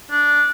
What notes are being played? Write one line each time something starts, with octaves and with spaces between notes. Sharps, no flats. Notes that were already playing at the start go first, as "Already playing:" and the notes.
D4